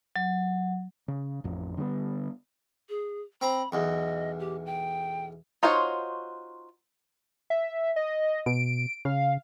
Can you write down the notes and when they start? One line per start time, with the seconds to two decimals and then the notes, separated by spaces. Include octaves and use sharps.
0.16 F#3
1.08 C#3
1.44 A1 F2
1.77 D3 G3 A#3 B3
2.89 G#4
3.41 C4 A#5 B5
3.72 B1 E2 D#5
4.40 G4
4.66 G5
5.63 D#4 F4 F#4 C5 C#5
7.50 E5
7.96 D#5
8.46 B2 D7
9.05 C#3 F5